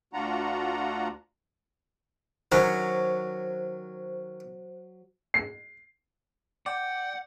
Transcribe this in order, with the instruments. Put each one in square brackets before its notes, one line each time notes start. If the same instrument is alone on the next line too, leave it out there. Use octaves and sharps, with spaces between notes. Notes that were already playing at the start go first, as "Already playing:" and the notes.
[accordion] D2 D4 F4 F#4 F#5 A#5
[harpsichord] D#3 C#4 [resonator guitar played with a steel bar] F#3 [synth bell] C5
[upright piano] C7
[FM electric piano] D5 [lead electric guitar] F#5 [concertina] G5